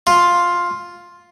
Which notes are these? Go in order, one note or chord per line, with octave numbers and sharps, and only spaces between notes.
F4